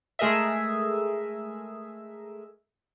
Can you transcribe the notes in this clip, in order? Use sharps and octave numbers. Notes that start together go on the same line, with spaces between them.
G#3 A3 G#4 A#4 D#5 E5